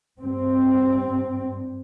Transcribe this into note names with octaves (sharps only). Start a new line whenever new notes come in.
G2 C4